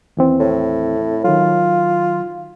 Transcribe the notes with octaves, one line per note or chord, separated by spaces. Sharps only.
D#2 E3 C4
A2
D#3 F#3 F4